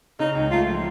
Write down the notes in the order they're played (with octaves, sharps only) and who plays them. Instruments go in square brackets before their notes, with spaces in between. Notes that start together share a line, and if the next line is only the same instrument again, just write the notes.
[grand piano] C#3 [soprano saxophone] D#4
[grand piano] C#2
[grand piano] A3 [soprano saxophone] F4
[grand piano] F3